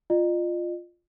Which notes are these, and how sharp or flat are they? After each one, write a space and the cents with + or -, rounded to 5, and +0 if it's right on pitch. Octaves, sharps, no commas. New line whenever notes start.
F4 +0 D#5 -40